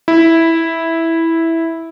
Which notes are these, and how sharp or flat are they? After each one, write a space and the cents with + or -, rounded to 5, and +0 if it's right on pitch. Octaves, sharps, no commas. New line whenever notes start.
E4 -5